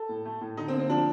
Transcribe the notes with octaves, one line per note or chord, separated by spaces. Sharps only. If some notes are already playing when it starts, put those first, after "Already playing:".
Already playing: A4
A2
A3
A2
D3 D#4
C4
A#3
C4
F3 D4